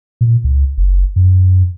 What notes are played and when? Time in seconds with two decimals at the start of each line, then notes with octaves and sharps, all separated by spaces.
0.21 A#2
0.44 C#2
0.78 F#1
1.16 F#2